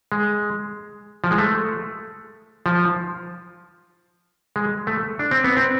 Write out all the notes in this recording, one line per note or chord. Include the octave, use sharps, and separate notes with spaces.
G#3
F3
G#3
A3
F3
G#3
A3
D4
C4
B3
C4